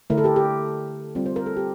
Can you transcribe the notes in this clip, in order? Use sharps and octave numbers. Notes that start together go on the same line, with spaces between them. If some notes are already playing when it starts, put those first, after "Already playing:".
D3 A3 E4 A#4
A4
G4 A#4
G4
G3 C4 F4
C5
A#4
A4
G4